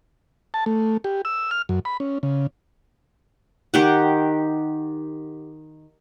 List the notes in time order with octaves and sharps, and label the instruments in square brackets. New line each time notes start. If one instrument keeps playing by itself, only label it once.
[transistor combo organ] A5
A3
G4
E6
F6
F#2
B5
C#4
C#3
[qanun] D#3 G4 F#5